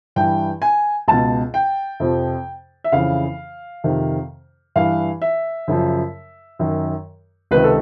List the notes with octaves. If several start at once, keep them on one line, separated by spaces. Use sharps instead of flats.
G2 E3 G5
G#5
C#2 B2 A5
G5
F2 C3 F3
E5
F2 C#3 E3 F5
F2 C3 D#3
G2 E3 F5
E5
F#2 C#3 F3
F#2 D#3
C#2 C3 D#3 B4
A4